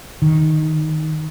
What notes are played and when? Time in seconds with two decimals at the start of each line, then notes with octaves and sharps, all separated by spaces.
0.22 D#3